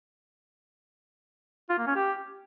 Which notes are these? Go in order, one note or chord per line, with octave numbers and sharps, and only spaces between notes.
F4
A#3
C#4
G4